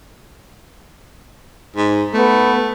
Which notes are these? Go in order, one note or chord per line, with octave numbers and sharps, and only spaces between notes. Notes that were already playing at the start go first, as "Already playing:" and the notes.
G#2
A3 B3